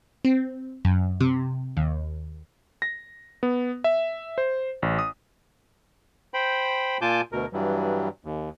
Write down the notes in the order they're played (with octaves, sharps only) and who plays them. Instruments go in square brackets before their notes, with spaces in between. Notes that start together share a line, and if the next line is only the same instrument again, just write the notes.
[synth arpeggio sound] C4
F#2
C3
D#2
[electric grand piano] A#6
B3
E5
C5
A1
D#6
[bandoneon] C5 G5 B5
A#2 F4 G#5 A5 D6 G6
D2 B2 A#4
G2 E3 F#3 G3
D#2